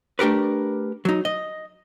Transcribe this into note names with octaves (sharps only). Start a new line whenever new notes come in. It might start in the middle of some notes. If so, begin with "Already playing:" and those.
A3 D4 G4 A#4 B4
F#3 D#4
D#5